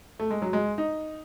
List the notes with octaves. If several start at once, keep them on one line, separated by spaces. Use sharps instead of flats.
A3
G#3
F#3
G#3
D#4